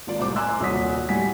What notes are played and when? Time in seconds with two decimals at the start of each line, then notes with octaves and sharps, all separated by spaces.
0.07 G#1 F4 D5
0.19 C2 A2 C5 D6
0.36 G#5 A#5 C6 D6 E6 F#6
0.60 D#1 C2 F#4 C#5 D#6 B6
1.09 A2 G3 F#5 G#5 B6